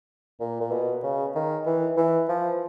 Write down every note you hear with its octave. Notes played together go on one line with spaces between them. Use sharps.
A#2
A#2
B2
C#3
D#3
E3
E3
F3